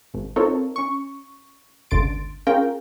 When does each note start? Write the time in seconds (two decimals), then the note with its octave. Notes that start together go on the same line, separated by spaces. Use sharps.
0.14 G#1
0.36 C4 D#4 F4 A4 A#4 C#5
0.76 C#4 C#6
1.91 G1 C#2 D3 C6 A6 D7
2.47 C#4 F4 G#4 A#4 F5 G5